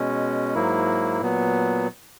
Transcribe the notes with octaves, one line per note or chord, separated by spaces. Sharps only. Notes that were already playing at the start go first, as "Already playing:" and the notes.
Already playing: B2 G#3 C#4
G#2 F#3 A#3 E4
A#2 F#3 B3